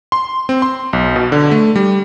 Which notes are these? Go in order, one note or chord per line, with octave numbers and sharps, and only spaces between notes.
C6
C4
C6
B1
B2
D3
A3
G3